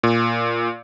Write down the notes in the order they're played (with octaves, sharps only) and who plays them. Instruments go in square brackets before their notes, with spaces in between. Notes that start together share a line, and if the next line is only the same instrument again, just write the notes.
[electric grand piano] A#2